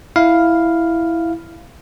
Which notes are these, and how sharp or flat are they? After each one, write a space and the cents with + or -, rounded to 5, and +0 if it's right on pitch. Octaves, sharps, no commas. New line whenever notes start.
E4 +0 F5 +0